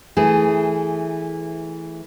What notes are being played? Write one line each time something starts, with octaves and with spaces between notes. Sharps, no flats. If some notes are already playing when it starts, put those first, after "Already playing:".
E3 A3 G#4